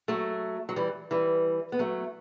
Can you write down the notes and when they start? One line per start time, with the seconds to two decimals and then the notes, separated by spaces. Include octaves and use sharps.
0.08 F#3 A3
0.69 F#3
0.76 E3 G3
1.11 E3 G3
1.72 B3
1.79 F#3 A3